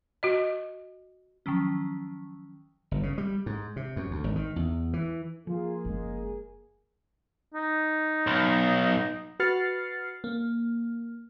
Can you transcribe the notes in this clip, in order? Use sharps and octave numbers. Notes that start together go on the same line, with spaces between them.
F#4 D#5
D#3 F3 F#3 C#4
G1
C#3
G3
G#2
C3
F#2
D2
G#1
D#3
E2
E3
F3 A#3 F4 G#4
F#1 G#3
D#4
B1
F#4 B4 F6 A6 C7 C#7
A#3